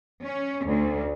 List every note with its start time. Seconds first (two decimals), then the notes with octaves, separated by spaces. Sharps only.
0.23 C#4
0.66 D2